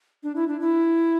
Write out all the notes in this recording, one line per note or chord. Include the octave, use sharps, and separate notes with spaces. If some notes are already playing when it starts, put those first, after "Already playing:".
D4
E4
D4
E4